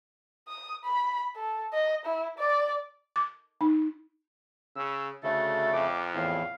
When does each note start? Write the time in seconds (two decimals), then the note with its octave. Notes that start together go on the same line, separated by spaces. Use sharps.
0.48 D#6
0.84 B5
1.36 A4
1.73 D#5
2.05 E4
2.38 D5
3.16 D6
3.61 D#4
4.76 C#3 E6
5.23 D2 C#3 A3 A4
5.73 F2 D6
6.14 E2 A2 F5